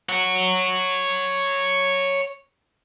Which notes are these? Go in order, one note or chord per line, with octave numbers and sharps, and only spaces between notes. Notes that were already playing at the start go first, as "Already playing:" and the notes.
C#5 F#5